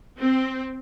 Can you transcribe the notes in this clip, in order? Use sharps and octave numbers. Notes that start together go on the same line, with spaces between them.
C4